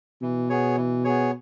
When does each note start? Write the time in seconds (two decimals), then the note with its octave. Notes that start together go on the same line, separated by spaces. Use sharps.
0.22 B2 E3
0.50 B3 G#4 C#5
0.77 E3
1.04 B3 G#4 C#5